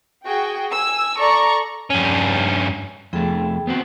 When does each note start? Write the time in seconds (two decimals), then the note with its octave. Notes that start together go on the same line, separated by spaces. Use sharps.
0.24 F#4 G#4 G5
0.71 G#5 E6
1.19 A4 D5 A#5 C#6
1.90 G2 C#4
3.13 F2 A3 B3 G#4 G5
3.67 B3 C4 F#4